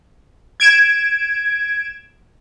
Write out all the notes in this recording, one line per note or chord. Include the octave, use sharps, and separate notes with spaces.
G#6 D7 E7